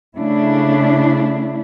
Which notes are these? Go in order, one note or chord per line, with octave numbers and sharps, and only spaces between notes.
C#3 A3 D4 E4